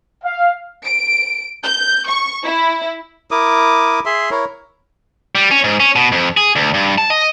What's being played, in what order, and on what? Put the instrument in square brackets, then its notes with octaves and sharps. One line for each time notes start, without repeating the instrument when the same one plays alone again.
[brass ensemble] F5
[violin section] D7
G6
C#6
E4
[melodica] E4 A#4 D6 D#6
G#4 E5 C6
E4 A#4 C#5
[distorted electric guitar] G3
C#4
G#2
C#4
B2
F2
G#4
D2
G2
A5
D#5